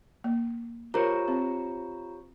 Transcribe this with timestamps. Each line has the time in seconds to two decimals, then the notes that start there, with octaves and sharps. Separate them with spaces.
0.24 A#3
0.94 F4 G4 A#4 C5 C#5 A#5
1.28 C4